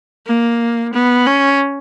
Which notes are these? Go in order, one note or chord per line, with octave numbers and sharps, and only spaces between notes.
A#3
B3
C#4